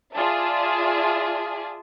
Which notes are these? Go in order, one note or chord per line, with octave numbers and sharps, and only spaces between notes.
F4 G#4 D5 E5 A5